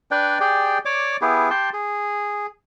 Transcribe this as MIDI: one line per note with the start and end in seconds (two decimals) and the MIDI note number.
0.11 0.38 62
0.11 0.38 71
0.11 0.38 74
0.11 0.38 79
0.40 0.78 67
0.40 0.78 68
0.40 0.78 74
0.40 0.78 79
0.85 1.17 73
0.85 1.17 74
0.85 1.17 86
1.21 1.50 59
1.21 1.50 64
1.21 1.50 67
1.21 1.50 68
1.50 1.70 67
1.50 1.70 79
1.50 1.70 81
1.50 1.70 84
1.73 2.46 68